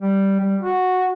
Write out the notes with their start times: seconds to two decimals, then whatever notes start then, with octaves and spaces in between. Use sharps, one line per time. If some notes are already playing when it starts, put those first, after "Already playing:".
0.01 G3
0.40 G3
0.61 F#4